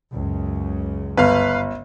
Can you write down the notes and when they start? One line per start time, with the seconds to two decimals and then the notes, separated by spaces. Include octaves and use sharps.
0.13 C#2 F#2 C#3
1.17 G1 B4 F5